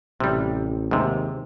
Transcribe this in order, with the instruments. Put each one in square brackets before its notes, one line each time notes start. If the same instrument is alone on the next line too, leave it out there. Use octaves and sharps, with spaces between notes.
[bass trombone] A1 [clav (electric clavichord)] C3 G3
[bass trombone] D#2 [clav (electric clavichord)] G#2 C3